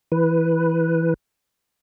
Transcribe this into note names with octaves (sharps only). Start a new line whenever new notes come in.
E3 B4